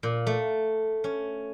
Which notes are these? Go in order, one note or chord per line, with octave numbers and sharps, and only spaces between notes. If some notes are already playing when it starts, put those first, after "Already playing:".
A#2
A3
C#4